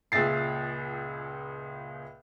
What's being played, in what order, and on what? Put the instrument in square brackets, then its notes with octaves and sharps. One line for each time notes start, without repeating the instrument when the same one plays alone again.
[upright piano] C#2 A#2 G#4 E5 A6 C7